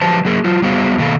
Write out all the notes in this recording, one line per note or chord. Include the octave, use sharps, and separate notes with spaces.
F3 F#3 G4 B4 C5 A5
F#3 A#3 G#4 A#4
F#3 F4
G3 B3 F#4 G#4 C5 F5
B2 D#3 A#3 A4 F5